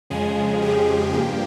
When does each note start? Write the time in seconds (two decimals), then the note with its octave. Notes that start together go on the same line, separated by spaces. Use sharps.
0.10 F2 C#3 F3 G#3 G#4
0.62 G4
1.13 G2 F3 A#3